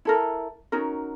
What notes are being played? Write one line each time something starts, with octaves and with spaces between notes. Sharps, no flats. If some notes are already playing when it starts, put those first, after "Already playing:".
E4 A4 A#4
C#4 D#4 F#4 A#4